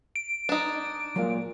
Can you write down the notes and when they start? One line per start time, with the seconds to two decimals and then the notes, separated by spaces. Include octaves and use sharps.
0.16 D7
0.49 D4 D#4
1.16 A#2 F#3 G#3 F5